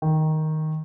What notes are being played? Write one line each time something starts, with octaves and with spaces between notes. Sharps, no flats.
D#3